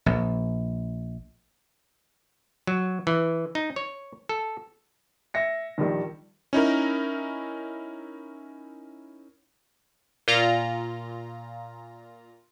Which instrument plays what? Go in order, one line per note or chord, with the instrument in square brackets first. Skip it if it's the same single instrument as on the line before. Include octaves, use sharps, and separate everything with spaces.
[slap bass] A#1
[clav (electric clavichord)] F#3
E3
D#4
C#5
A4
[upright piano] E5 A#6 C#7
A#1 D#3 G3
[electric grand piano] C#4 D#4 E4 A#4
[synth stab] A#2 F4 A#5